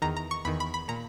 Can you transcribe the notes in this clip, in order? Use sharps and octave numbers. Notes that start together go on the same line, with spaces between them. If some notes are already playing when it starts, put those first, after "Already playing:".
E2 D#3 A#5
A#5
C#6
E2 D#3 B5
B5
B5
A#2 A#5